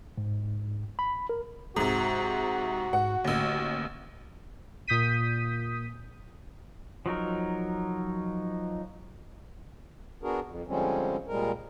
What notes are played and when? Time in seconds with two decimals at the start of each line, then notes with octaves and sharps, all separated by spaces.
0.17 G#2
0.99 B5
1.29 A#4
1.76 D1 G#2 C3 F#4
2.93 G#2 F#5
3.25 A1 D#2 D3
4.88 A#2 D#6 G6 B6 D#7
7.06 F3 F#3 D#4 A#4
10.23 B3 D4 F#4 G#4 A#4
10.45 F2
10.67 D3 F3 G3 G#3 C4 C#4
11.28 A#2 G3 G#3 A#4